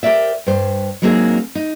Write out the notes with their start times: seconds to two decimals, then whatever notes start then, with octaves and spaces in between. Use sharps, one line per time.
0.03 G4 A#4 C5 D5 E5
0.47 G2 C5
1.02 F#3 G#3 A#3 C4 D#4 G#4
1.55 D#4